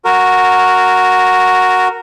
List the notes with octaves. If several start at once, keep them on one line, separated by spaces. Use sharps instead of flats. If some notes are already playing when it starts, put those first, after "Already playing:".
F#4 A#4